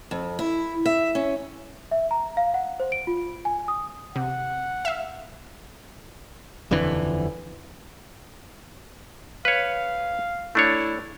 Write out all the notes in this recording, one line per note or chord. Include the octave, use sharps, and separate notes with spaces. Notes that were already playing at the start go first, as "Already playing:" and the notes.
F2
E4
E5
C#4
E5
A#5
F5
F#5
C5
D7
F4
G#5
D#6
C3 F#5
E5 F5
D#1 F2 D3 E3
B4 C#5 F5
A3 D4 E4 C#5